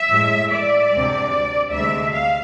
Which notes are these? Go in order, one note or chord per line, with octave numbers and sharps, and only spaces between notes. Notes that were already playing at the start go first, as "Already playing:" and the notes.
Already playing: E5
A2 G#3
D5
D2 C3 G#3
D2 C3 G#3 E5
F5